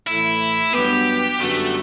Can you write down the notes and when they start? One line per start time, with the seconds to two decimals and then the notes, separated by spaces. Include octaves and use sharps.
0.07 A2 E3 A3 E4
0.73 G2 F#3 B3 G4
1.40 F#2 D3 G3 A3 B3 F#4